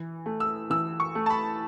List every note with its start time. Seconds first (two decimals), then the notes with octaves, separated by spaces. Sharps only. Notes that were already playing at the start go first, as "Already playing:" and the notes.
Already playing: E3
0.26 A3
0.40 E6
0.70 E3 E6
1.00 C#6
1.15 A3
1.26 A5
1.30 B5